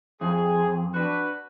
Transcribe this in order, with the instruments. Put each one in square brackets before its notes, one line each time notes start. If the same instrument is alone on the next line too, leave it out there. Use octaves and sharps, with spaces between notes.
[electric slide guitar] F2 [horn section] G#4
[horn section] D4 F#4 B4